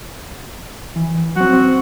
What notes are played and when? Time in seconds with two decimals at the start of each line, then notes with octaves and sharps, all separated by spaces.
0.96 E3
1.36 F#3 C4 F#4
1.53 C4